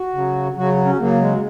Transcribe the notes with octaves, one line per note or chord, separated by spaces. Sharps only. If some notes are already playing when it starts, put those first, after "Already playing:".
Already playing: F#4
C#3 F#3
C#3 F#3 F#4
C#4
C#3 F#3 A#3
G#3